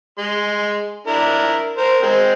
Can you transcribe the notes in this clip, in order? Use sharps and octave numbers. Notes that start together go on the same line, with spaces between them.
G#3 C6
D4 E4 A#4
A#4 C5
G#3 C4